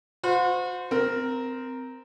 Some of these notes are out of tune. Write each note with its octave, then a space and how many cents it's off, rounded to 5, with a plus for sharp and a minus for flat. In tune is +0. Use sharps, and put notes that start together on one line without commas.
F#4 -40 C5 -25
C4 -20 A#4 +0